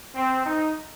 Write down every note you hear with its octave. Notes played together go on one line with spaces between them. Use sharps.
C4
D#4